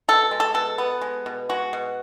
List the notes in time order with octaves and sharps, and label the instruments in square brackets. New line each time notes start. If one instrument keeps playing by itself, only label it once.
[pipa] B2 A4
G#3
A4
B2 A4
B3
G#3
B2
G#3 F#4
B2